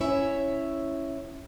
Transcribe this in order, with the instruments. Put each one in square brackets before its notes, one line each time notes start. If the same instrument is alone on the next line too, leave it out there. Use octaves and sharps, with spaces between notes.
[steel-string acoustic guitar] C#4 E4 C#5 E5